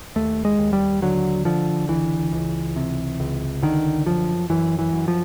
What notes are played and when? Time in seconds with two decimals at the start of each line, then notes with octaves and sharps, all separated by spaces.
0.16 D#2 A3
0.45 G#3
0.59 D#2
0.73 G3
1.02 D3 F#3
1.45 D3 F3
1.89 C#2 E3
2.32 C#2
2.76 C3
3.20 C#2
3.62 D3 D#3
4.06 F#2 F3
4.50 F#2 E3
4.79 E3
4.93 F#2
5.08 F3